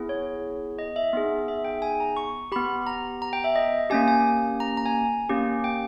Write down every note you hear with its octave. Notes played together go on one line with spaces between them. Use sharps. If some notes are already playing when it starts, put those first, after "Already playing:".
Already playing: B3 E4 G#4
C#5
D#5
E5
B3 D#4 G#4
E5
G5
G#5
A#5
C#6
B3 G4 B5
A#5
A#5
G5
E5
D#5
A#3 C#4 G4 G#5
G#5
A#5
A#5
G#5
A#3 C#4 G4
G5